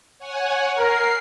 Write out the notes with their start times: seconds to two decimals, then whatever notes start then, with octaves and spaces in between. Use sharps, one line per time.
0.18 C#5 F#5 G#5
0.78 A#4 C7